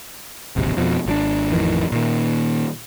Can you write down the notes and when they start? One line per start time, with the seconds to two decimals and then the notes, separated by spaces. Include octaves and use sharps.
0.56 D1 G#1 C3
0.77 F2 G#2 B2 F3
1.06 G#1 F3 D4
1.52 A1 F2 D#3 E3
1.92 A#2 D#3